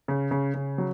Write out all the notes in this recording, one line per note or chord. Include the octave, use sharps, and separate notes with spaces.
C#3
C#3
C#3
F#3